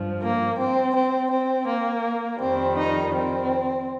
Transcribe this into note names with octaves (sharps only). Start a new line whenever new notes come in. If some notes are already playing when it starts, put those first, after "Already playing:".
Already playing: G2 F3
A#3
C4
C4
C4
A#3
F2 D#3 G3 C4
D#4
C4